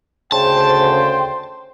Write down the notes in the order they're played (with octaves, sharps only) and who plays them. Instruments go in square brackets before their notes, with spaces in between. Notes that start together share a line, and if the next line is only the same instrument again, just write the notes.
[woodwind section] D2 C#3 [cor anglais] C5 [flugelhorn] G5 [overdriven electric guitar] A5